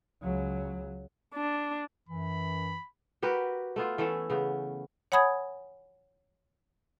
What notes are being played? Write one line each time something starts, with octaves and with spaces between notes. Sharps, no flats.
C#2 F#3
D4
F#2 E3 B5
F#4 G4 A#4 B4
A3 B3 F4
E3 A3 C#4 A4
C#3 B3
C#5 F#5 G#5 B5 D#6 G#6